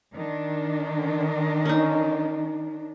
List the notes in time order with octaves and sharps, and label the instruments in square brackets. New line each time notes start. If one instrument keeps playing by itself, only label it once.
[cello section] D#3 D4
[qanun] C#4 D#4